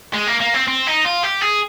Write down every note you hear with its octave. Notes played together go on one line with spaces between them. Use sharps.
G#3
A#3
A#3
C4
C4
D#4
F4
G4
G#4